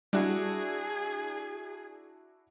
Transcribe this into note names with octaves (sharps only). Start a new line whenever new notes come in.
G3 D4 E4 F#4 G#4